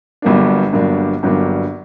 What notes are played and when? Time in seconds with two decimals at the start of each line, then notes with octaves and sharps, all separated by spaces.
0.22 G1 G2 F#3 A#3 D4
0.73 G1 G2 F#3 A#3 D4
1.23 G1 G2 F#3 A#3 D4